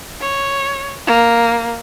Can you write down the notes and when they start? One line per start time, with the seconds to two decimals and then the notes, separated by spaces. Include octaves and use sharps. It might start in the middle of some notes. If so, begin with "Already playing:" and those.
0.21 C#5
1.07 A#3